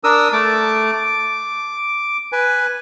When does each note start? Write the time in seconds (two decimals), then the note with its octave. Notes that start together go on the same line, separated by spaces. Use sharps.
0.04 D4 A#4 D#6 E6
0.33 A3 A5 D6
0.93 D6
2.32 B4 G#5